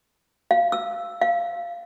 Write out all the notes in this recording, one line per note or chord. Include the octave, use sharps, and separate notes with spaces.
F5
E6
F5